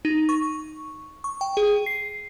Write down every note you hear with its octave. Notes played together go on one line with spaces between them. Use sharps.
D#4
C#6
C#6
G5
G#4
C7